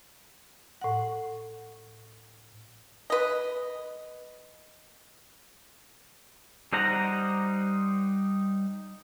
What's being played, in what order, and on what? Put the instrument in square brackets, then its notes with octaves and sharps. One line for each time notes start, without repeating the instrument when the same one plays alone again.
[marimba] A2 F#5
[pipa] B4 D#5
[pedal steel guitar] G3 D#4 C5 F#5 A#5